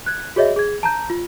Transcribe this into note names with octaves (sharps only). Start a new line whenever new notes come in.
F#6 G#6
F#4 G#4 C#5 D#5 E5
G#4 G#6
A5 A#5 G6
F4